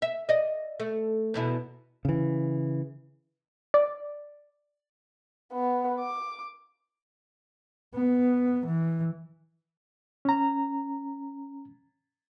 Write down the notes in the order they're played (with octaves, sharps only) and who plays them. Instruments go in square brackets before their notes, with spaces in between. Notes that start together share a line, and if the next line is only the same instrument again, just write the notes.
[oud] E5
D5 D#5
A3
E2 B2 E4
[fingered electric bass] C#3 E3
[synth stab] D5
[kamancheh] B3
D6
[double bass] B3
E3
[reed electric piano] C#4 A#5